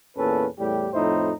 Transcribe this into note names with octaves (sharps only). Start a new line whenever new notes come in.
E2 A#2 C#4 A4 B4
E2 A2 G3 G4
F2 A2 D#4 E4 C5